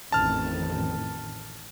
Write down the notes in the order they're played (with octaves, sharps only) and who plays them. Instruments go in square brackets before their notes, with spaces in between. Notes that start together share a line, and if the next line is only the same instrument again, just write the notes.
[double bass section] A1 F2 D#3 [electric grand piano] A5 F6